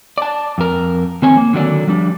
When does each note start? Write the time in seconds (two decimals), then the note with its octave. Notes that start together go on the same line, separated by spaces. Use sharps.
0.18 D5 A5
0.58 F2 A#4
1.22 D#3 C4 C#5 G#5
1.37 A#3
1.53 D3 D#3 F#3 D5
1.87 F3 G3 D4